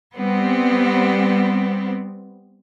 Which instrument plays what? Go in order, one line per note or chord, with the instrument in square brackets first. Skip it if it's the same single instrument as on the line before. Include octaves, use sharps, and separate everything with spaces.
[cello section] G3 B3 C4